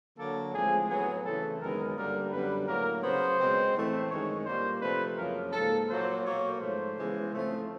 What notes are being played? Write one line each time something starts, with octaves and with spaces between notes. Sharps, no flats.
D3 F#3 A#3 A4
A2 F3 G#3 C4 G#4
A2 F#3 B3 G#4
C#3 E3 A3 C4 A4
F#2 D#3 G#3 B3 A#4
G2 D3 G3 A#3 A#4
F#2 D3 G3 B3 B4
A2 F#3 A#3 A#4
C#3 F#3 B3 C5
B2 G#3 C4
A2 E3 A3 C4
F#2 D#3 G#3 C#5
A#2 G3 A#3 C5
C3 F3 A3 C4 B4
F#2 C#3 F3 A#3 A#4
G#2 F3 A#3 A4
A#2 F#3 A#3 C5
B2 F#3 A#3 C#5
G#2 F3 A3 C5
C#3 E3 G#3 B3
A2 F3 A3 C4